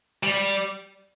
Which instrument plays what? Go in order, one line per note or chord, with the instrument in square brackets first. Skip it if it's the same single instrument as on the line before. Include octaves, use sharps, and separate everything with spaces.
[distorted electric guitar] G3